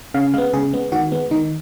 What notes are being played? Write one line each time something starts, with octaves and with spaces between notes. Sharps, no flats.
C#3 F5
G#3 B3 F5
C#3 G#4
G#3 B3
D#3 F#4
G#3 B3
D#3 D#4